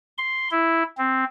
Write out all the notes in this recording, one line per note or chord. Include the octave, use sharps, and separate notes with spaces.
C6
E4
C4